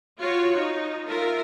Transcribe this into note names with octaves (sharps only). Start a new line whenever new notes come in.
F4 F#4 C#5
D#4
F4 A#4 E5